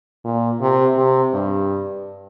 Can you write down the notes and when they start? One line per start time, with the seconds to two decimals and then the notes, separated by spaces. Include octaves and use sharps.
0.25 A#2
0.61 C3
0.97 C3
1.34 G2